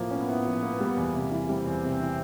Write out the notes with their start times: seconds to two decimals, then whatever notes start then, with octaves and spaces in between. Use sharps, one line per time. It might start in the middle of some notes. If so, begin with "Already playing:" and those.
Already playing: A2 F3 A#3
0.10 B3 C#4
0.28 A2
0.45 F3
0.62 A#3
0.80 G3
0.97 E2
1.14 C3
1.31 E3
1.48 G3 C4
1.66 E2
1.83 C3
2.00 E3